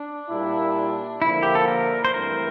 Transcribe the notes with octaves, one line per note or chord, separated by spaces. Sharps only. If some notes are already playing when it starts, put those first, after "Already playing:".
Already playing: D4
A#2 G3 A#3 E4
D3 F3 A#3 E4
G4
A4
A#4
C5
G2 E3 A3 C4 E4 A#4